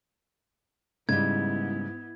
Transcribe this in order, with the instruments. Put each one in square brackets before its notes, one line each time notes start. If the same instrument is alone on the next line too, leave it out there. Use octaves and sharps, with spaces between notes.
[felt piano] G#2 [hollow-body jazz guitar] C#3 G3 [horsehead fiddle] B3 E4 [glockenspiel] G#6